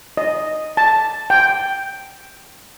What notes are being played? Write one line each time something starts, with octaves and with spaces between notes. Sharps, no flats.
D#5
A5
G5